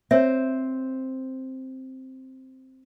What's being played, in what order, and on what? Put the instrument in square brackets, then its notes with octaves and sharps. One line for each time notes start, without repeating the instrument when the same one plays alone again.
[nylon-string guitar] C4 [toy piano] C#5 E5